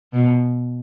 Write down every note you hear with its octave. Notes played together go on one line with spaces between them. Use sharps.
B2